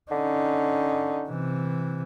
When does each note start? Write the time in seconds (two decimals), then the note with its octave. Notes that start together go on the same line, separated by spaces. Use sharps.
0.11 D3 C#4 D#4
1.29 C3 E3